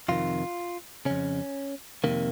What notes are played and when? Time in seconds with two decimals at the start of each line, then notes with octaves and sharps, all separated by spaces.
0.08 F2 C3 D#3 F4
1.05 F2 C#3 C#4
2.04 F2 C3 D#3 A#3